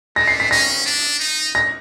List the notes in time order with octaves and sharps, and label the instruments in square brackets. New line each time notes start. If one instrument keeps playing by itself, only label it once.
[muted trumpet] A3 [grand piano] A#6
[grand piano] C7
B6
[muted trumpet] C#4 [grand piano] A#6
[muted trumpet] D4
D#4
[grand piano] A#6